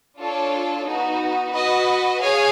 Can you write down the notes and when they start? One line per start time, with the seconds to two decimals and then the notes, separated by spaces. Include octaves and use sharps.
0.18 D4 F4 A4 C#5
0.86 B3 D#4 F#4
1.54 F#4 B4 D#5
2.21 G#4 C#5 F5 G#5